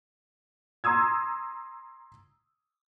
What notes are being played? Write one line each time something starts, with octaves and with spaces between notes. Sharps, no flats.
A#5 C6 D#6 E6 G#6